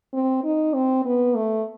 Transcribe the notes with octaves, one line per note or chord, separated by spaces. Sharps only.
C4
D#4
C4
B3
A3